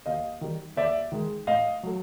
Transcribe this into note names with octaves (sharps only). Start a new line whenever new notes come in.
D#2 D#5 F5
D#3 G3
D#2 D5 E5
D#3 G#3
A2 D#5 F5
F#3 A3